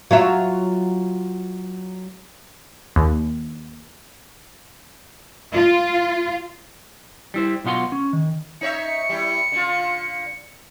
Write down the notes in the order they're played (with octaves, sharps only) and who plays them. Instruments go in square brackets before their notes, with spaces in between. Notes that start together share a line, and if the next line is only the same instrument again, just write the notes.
[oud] F#3 F4 E5
[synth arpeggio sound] D#2
[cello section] F4
[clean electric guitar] G3 E4 C5
B1 B2 F4 F#5 C6
C#4
D#3
[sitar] D#4 C#5 E5 [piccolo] C#7
[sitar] G3 E4
D3 F4